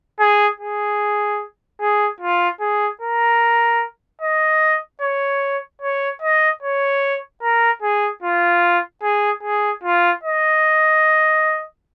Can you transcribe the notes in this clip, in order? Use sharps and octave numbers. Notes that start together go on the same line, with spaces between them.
G#4
G#4
G#4
F4
G#4
A#4
D#5
C#5
C#5
D#5
C#5
A#4
G#4
F4
G#4
G#4
F4
D#5